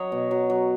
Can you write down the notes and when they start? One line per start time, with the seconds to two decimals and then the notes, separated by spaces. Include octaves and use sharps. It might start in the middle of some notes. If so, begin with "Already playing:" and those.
Already playing: F#3 C#5 D#5
0.12 B2
0.31 F#3
0.50 F#3